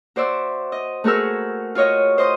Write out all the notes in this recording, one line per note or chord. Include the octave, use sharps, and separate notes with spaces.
F#4 C5 D5 E5
D#5
A3 F#4 G#4 A#4 E6
F4 F#4 C#5 D#5
C5 D#5 D#6